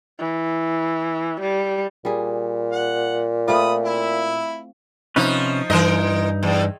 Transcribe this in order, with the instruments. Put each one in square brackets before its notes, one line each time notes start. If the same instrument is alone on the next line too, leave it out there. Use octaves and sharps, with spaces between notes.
[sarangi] E3
G3
[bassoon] A#2 [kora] G3 G#4
[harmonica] F#5
[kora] A3 C4 F4 [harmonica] B5 D#6
[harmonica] E4 E5
[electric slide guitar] C3 C#4 B4 [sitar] F3 D#4
[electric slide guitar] G2 D#4 [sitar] E3 A#4 D#5
[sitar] E2